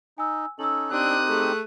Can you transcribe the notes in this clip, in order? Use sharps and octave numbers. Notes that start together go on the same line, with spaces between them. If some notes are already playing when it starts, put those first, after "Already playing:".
D#4 G#5 E6
C#4 D#4 A4 E6 F#7
C4 D4 D#4 G4 D#6 F#6
A3 G#4